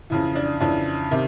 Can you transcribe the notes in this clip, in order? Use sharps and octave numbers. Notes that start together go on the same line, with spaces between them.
F2 C#3 E3
D4
F2 C#3 E3 D4
C3 D#3